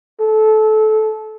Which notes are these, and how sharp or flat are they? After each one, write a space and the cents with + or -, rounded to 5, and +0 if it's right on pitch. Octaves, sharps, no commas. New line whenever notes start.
A4 -20